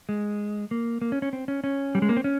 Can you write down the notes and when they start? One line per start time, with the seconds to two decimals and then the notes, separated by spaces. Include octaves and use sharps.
0.09 G#3
0.71 A#3
1.02 A#3
1.12 C#4
1.22 C#4
1.33 C4
1.48 C#4
1.64 C#4
1.95 G3
2.02 G#3
2.09 A#3
2.17 C4
2.24 C#4